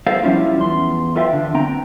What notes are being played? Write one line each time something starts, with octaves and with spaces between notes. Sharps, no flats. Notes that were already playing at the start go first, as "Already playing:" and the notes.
G#4 A4 B4 C5 F5
F3 G3 C#4 E4 F4
E2 C6
F4 A4 B4 E5 F5 G5
D3
C4 G5 A#5